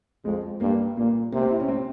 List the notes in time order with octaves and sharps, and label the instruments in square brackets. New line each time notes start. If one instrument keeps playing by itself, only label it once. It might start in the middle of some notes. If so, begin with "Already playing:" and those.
[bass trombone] F2 [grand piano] G#3
[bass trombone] G2 [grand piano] A#3
[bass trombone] A#2 [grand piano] A#3
[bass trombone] C3 [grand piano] A#3
[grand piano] C4
E4
C#4
C4